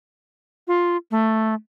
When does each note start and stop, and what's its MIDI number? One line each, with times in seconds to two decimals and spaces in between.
0.68 0.97 65
1.11 1.54 57